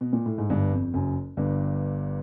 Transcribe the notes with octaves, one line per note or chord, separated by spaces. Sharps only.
B2
A#2
A2
G#2
G1 G2
F2
F#1 F#2
G1 G2